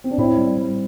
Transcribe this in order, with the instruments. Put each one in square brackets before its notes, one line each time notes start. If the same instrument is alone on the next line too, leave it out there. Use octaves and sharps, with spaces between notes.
[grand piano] C4
D4
[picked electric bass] A2 [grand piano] C4 E4
[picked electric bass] G3
G3